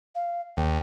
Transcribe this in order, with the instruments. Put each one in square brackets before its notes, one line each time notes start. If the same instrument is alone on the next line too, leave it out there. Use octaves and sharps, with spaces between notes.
[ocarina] F5
[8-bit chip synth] D#2 [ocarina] G5